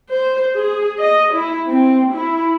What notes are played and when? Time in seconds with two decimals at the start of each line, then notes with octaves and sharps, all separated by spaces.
0.12 C5
0.58 G#4
1.00 D#5
1.34 E4
1.69 C4
2.13 E4